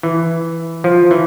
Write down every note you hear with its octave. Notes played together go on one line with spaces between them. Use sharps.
E3
F3
E3